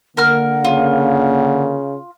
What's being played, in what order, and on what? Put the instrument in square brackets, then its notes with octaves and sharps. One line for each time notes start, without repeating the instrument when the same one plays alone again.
[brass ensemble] D3 A#3 [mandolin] A#4 F6 [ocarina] F#5
[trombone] C#3 [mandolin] F4